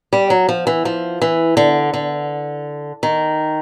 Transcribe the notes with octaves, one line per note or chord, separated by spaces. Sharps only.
G3
F#3
F3
E3
F3
E3
D3
D3
D#3